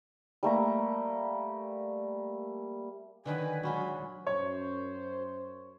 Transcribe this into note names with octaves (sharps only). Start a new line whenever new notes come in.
G3 A3 A#3 A#5
D3 D#3 F#3 B4 G#5
F#3 G#3 F4 F#4 B5
F#2 C5 C#5